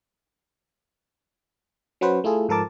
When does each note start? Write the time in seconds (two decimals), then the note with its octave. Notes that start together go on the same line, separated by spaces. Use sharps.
2.01 F#3 C#4 F#4 B4 C5
2.24 A3 E4 F4 G#4 A4
2.49 G#2 F3 A4 A#4 A5 D6